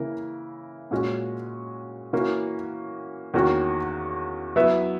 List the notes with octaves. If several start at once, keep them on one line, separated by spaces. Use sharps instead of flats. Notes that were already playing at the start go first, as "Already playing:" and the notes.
Already playing: C#3 E3 A#3 E4 A#4
A#2 G#3 C#4 F#4
E3 A#3 C#4 F#4
E2 D#3 A#3 C#4 F#4
F#3 B3 E4 B4 E5